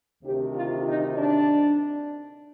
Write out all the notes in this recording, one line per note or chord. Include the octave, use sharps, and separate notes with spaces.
D2 C3 D#3 G4
F4
D#4
D4